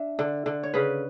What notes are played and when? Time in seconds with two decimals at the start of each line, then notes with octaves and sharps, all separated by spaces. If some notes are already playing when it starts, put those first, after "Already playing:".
Already playing: D4 E5
0.19 D3
0.46 D3
0.63 C#5
0.74 C#3 B4